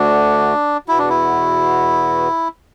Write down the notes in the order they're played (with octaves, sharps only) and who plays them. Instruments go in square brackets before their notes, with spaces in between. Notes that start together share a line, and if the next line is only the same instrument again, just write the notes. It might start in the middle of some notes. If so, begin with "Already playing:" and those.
Already playing: [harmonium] D2 D3 A3 F#4 [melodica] D4
[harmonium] E2 B2 B3 F#4 [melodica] E4
[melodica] D4
E4